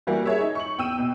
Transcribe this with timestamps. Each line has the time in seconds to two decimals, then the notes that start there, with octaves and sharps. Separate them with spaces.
0.07 E3 G3 A#3 E4 F#4
0.26 G#4 C#5 E5
0.41 D#4
0.55 C#6 F#7
0.78 E2 G5 E6 D#7
0.98 B2